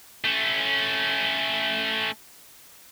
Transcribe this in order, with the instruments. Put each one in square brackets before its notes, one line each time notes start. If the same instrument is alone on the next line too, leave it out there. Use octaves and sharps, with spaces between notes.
[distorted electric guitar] A3 C#4